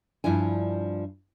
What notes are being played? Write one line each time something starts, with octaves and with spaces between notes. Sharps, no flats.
G2 F3 D4 E4 G#5